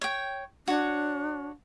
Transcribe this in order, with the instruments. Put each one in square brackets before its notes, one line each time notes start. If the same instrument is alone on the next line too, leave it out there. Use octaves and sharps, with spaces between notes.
[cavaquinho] C#5 G5
[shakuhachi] D4 [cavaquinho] F#4 C#5